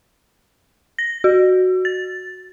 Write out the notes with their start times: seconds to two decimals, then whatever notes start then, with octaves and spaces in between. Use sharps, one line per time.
0.99 A#6
1.24 F#4
1.85 A6